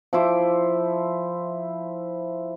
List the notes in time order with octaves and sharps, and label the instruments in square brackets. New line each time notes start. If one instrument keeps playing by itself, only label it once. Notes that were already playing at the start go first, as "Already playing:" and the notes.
[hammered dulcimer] F3 E4 C5 D6